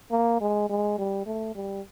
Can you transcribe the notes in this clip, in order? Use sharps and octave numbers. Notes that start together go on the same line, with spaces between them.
A#3
G#3
G#3
G3
A3
G3